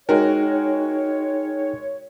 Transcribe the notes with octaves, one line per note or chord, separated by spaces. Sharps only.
G#3 D#4 F#4 G#4 A#4 C#5 G5